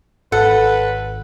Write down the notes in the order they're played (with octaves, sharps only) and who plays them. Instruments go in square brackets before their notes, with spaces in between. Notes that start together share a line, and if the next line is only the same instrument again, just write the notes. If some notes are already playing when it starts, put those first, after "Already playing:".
[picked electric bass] G#1 [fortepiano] A4 [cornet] B4 [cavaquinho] F#5